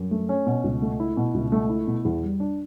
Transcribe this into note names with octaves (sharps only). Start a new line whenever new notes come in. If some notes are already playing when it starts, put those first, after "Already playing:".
Already playing: F#2
A3
C#4
B2
C#2
A3
E4
B2
C#2
A3
E4
B2
E2
G3
D4